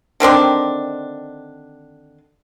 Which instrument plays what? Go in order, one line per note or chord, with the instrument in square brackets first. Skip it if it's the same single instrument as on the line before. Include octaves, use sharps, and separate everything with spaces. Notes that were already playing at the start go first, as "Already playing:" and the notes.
[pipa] D3 D#3 C4 D4